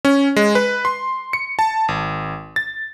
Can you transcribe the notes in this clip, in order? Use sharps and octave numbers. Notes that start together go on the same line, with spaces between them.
C#4
G#3
B4
C6
C#7
A5
G#1
A6